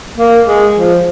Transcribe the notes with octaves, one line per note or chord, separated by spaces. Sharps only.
A#3
G#3
F3